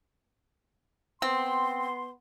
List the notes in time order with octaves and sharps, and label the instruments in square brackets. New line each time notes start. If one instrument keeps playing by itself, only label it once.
[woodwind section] B3 C6 [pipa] C4